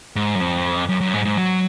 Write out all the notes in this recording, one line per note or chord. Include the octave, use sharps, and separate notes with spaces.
G#2
F#2
F2
F#2
F#2
G#2
G#2
F#3